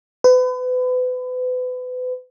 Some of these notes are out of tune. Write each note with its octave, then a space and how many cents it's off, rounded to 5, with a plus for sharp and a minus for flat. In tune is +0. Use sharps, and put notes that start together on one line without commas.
B4 +35